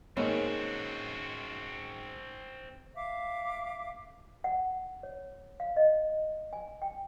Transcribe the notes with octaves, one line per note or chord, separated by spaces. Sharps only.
G#1 A#3 C4 C#4 F#4
E5 F5 D6
F#5
C#5
F5
D#5
G#5
G5